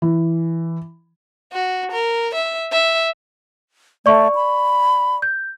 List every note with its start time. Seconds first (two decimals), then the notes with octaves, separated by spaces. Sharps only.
0.02 E3
1.52 F#4
1.91 A#4
2.34 E5
2.72 E5
4.06 A3 D5 C#6
4.35 B5
5.22 G6